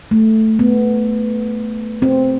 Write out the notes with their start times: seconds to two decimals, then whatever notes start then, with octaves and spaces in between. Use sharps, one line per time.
0.11 A3
0.59 B3
2.02 C4